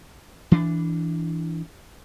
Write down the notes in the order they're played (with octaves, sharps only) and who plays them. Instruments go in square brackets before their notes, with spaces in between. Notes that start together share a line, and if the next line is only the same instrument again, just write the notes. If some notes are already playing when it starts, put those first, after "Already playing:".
[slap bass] E3 D4